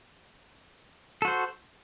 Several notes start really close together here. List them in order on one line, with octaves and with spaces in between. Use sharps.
A4 F#4 C5